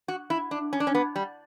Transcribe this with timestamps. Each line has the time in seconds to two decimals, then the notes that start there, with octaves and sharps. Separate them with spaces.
0.08 F#4
0.30 E4
0.51 D4
0.73 C#4
0.80 D4
0.87 C#4
0.95 B3
1.16 G3